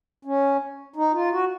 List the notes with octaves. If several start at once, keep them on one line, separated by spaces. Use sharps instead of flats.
C#4
D#4
F4
F#4